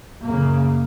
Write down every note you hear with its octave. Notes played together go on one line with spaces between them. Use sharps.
F#2 C#3 A#3